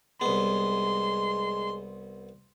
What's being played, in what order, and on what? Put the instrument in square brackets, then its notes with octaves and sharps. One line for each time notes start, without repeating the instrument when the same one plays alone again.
[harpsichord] C2 B3 [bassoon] G#3 [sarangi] C6